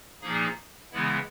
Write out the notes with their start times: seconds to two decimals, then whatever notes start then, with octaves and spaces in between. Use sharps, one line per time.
0.22 A#2 F3 A#3 D#4 G#4
0.92 C#3 E3 G#3 B3 E4